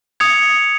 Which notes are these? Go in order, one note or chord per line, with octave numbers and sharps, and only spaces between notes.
D#6 G#6 C#7 F7